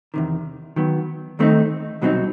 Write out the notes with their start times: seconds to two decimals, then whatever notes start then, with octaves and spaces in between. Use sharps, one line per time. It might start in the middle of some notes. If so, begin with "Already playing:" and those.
0.14 E2 C3 D#3
0.76 D#3 F#3 B3
1.39 D#2 D#3 A3 C4 D#4
2.01 C2 B2 F#3 C4 D#4